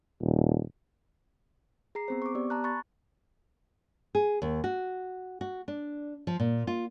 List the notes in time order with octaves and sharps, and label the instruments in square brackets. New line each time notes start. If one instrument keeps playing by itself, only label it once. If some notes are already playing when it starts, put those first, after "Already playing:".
[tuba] D#1
[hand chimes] G#4 A#5 C7
B3 C4 C5
C#6 D6
B3 G4 D5
A5 A#5 F#6
B5 C#6 F#6 A6
[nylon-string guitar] G#4
D#2
F#4
F#4
D4
F3
A#2
F4